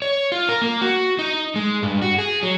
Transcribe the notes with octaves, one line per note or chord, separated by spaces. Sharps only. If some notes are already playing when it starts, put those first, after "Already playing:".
C#5
F4
A#4
A#3
F#4
D#4
G#3
G2
F#4
G#4
F#3